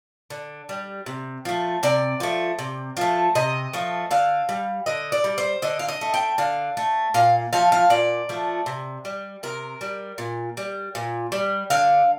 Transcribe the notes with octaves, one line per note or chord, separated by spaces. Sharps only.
D3
G3
C3
F3 A3
C3 D5
F3 A3
C3
F3 A3
C3 D#5
F3 A3
D3 F5
G3
D3 D#5
D5
G3
C5
D3 D#5
F5
D#5
A3
G5
D3 F5
A3
A#2 F5
F3 A3 F5
F5
A#2 D5
F3 A3
C3
G3
C3 A#4
G3
A#2
G3
A#2
G3
D3 F5